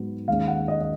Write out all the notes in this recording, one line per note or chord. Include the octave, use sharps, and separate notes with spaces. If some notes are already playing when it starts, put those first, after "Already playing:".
Already playing: G#2 F#3 B3
D#2 D#3 G#3 C#4 F5
F#5
D#5
D#5